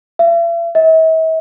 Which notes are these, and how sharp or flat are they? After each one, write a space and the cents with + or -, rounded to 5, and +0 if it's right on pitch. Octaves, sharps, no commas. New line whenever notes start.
E5 +45
E5 -45